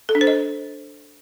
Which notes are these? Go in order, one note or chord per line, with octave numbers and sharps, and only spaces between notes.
A4
D4
C5
D#5